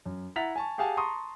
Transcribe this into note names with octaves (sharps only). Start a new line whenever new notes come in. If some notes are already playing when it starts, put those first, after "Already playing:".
F#2
E4 F#5 A#5 A6 B6 F7
G#5 A5 C#6
G4 G#4 F5 F#5 G#5 A5
A5 A#5 C6 C#6 D#6